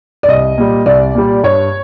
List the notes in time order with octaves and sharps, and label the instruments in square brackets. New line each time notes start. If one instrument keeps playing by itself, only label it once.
[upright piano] D5
[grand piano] C2 [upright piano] D#5
[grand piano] A#2 G3
[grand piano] C2 [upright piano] D5
[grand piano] A#2 G3
[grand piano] G2 [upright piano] C#5